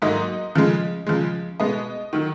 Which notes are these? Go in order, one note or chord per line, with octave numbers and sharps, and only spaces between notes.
G#2 F#3 A#3 D#4 D#5
C#3 F3 G#3
C#3 F3 G#3
B2 G#3 B3 D#5
D#3 F#3